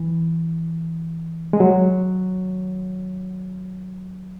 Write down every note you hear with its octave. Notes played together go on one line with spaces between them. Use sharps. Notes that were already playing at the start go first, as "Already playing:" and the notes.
Already playing: E3
G#3
F#3